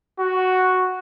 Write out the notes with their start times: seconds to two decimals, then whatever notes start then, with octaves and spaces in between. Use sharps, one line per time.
0.19 F#4